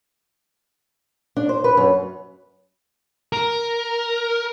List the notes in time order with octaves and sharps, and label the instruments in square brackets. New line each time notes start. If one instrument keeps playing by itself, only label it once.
[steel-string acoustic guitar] D4
C5
B4
F#2
[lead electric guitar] A#4